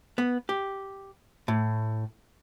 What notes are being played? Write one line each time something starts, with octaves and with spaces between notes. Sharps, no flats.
B3
G4
A2